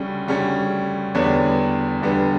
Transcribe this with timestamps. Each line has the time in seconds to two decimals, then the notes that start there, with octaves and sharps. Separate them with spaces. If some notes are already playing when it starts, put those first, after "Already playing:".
Already playing: D2 C#3 G3 C#4
0.27 D2 C#3 G3 C#4
1.15 E2 D3 G3 B3 D4 C#5
2.02 E2 D3 G3 B3 D4